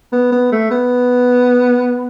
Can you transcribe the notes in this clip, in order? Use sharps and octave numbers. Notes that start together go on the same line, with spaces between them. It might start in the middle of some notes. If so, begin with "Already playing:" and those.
B3
B3
A3
B3